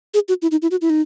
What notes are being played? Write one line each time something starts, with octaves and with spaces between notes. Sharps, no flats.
G#4
F#4
E4
D#4
E4
F#4
E4
D#4